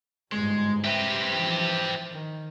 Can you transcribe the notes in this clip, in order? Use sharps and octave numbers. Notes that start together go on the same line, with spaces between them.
G1 G#2 G#3
G4 B4 C5 E5
E3 F3
D#3